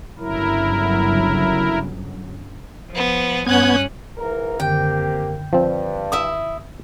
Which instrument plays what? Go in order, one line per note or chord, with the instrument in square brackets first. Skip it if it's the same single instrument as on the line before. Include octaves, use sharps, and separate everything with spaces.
[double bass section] G1 C#3 F#3 [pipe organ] E4 A#4
[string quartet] F3 B3
[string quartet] G2 C#4 F#6 [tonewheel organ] B3 G#6
[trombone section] G#2 E3 A#4
[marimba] F#2 D3 D#3 [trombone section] A#3 C4 G4 [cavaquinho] G5
[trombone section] G2 [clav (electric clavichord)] F3 C4
[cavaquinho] E4 E5 D#6